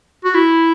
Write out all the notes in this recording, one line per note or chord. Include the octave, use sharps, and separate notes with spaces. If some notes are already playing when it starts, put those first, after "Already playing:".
F#4
E4